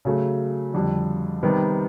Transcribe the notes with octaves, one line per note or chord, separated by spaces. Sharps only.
C#3 F#3 A3
F2 D3 G3
C3 D#3 G3 B3